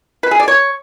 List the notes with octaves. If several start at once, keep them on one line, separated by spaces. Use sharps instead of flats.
B4
G#4
D5
C#5